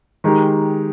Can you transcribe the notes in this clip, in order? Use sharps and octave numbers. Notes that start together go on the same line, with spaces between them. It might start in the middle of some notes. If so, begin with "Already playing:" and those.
D#3 G#3 D#4 G4